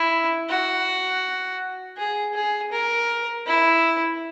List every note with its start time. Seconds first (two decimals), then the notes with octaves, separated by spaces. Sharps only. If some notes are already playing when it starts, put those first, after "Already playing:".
Already playing: E4
0.49 F#4
1.97 G#4
2.35 G#4
2.72 A#4
3.47 E4